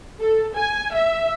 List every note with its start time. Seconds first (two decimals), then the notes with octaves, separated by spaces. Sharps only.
0.20 A4
0.56 G#5
0.94 E5